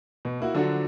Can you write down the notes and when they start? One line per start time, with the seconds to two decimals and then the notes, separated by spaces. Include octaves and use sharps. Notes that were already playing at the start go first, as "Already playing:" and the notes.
0.25 B2
0.40 A#3 E4 F#4
0.54 D3 F3 F#3 D4 F#4 A4